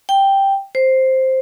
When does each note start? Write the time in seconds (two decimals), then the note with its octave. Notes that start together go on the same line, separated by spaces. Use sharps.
0.09 G5
0.75 C5